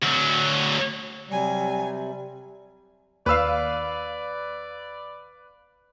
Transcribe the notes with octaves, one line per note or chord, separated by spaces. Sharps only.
D2 F#3
C3 F#3 G3 G#5
D#2 B4 D5 F5 E6